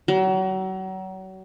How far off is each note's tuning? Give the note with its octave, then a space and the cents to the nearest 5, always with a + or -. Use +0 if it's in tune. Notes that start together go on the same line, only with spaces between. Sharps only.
F#3 +35